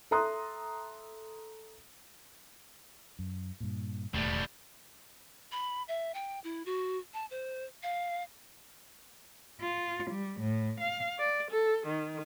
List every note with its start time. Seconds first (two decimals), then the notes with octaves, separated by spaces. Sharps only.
0.11 A4 E5 A#5 C6 D#6 F#6
3.19 F#2
3.60 G2 A#2
4.14 E1 D#2 A2 G3 A3
5.52 B5
5.88 E5
6.14 G5
6.44 E4
6.66 F#4
7.14 A5
7.31 C5
7.83 F5
9.60 F4
10.10 G3
10.39 A2
10.80 F5
11.19 D5
11.52 A4
11.87 D#3